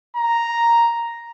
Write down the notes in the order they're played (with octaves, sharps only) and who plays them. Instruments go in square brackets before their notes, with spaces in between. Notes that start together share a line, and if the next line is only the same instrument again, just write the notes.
[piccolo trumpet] A#5